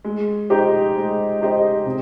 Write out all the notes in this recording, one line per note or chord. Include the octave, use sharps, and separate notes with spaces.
G#3
D#4 G4 C5 D#5
G#3
D#4 G4 C5 D#5
C3